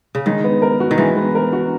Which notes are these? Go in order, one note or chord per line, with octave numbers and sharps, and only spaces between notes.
C#3
D#3 G#3
B3
A#4
F#4
D#3
E3 G#3
B3
A#4
F#4